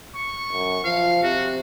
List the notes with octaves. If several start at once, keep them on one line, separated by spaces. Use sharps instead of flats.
C#6
F#2
F3 F5
C3 F#4